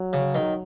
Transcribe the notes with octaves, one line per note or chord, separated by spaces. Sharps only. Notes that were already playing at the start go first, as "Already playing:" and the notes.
Already playing: F#3
C#3
D#3